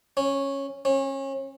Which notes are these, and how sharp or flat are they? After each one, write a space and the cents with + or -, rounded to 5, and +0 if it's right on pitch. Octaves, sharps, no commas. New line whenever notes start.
C#4 -10
C#4 -30